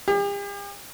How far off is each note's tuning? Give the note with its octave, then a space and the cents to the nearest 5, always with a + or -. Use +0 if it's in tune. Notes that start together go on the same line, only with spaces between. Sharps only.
G4 +45